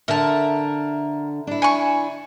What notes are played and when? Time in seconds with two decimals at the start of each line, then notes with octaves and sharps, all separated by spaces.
0.08 D3 A#4 E5 A5
1.47 D4 E4
1.62 G#5 C#6